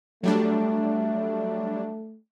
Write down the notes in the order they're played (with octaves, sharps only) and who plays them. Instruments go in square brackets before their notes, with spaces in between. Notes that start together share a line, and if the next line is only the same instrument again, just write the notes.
[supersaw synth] F#3 G3 D4 [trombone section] A3